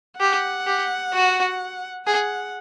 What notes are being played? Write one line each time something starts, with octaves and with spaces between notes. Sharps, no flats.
G4 F#5
G4
F#4
G#4 F#5